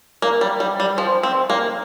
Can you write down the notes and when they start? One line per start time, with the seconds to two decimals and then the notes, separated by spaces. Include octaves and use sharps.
0.22 A#3
0.41 G3
0.60 G3
0.80 G3
0.98 F3
1.23 C4
1.50 A#3